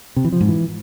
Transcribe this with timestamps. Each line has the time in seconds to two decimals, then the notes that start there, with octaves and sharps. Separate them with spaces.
0.16 C3
0.25 E3
0.33 F3
0.41 G#2
0.49 E3